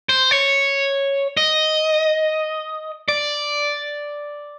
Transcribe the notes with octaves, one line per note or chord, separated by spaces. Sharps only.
C5
C#5
D#5
D5